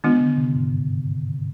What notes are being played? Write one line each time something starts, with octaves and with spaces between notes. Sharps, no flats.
D#3 G#3 B3 D4 F4
D3
C3
G#2
G2